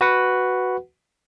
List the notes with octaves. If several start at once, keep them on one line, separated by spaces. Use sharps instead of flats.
F#4 B4 F#5